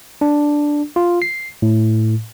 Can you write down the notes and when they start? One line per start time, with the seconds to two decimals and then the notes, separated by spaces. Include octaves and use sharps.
0.21 D4
0.96 F4
1.22 C7
1.62 A2